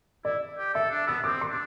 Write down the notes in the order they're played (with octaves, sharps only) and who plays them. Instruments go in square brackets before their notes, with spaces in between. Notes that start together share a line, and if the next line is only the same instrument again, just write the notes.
[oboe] E4 [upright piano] D5
[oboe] G4
[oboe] A4 [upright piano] E5
[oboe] D4
[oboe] B3 [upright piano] E6
[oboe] C4 [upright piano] D6
[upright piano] C6
[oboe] D4